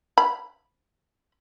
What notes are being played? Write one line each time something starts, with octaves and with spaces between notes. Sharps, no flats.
B5